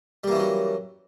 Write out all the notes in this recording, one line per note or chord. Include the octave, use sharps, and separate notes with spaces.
E3 F#3 G3 A#3 C#4